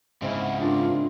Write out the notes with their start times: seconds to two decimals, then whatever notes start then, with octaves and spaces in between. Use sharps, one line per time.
0.22 G#2 C#3 G#3 C4 E4
0.41 F#5
0.61 D4 F4 A#4